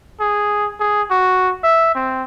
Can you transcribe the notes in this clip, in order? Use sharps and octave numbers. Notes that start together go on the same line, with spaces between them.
G#4
G#4
F#4
E5
C4